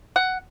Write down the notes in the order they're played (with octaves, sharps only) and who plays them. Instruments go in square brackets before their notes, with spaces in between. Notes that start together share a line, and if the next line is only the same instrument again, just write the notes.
[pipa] F#5